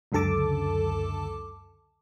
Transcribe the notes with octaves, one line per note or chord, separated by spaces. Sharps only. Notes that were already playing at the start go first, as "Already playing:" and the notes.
C#2 F#2 D3 A4 A5 D6